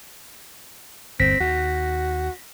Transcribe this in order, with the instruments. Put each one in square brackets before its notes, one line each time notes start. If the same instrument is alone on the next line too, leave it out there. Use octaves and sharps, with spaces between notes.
[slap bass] G1 D#2 [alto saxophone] C4 [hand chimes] A#6 B6
[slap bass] D#2 [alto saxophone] F#4